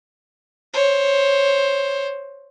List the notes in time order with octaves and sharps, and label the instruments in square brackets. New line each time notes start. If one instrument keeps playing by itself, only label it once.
[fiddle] C5 C#5